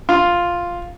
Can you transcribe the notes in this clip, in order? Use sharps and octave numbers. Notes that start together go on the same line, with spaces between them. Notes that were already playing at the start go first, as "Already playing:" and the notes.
F4